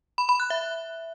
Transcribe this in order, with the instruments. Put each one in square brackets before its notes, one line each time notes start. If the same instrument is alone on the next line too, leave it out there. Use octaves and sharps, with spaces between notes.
[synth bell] B5
B5
F#6
E5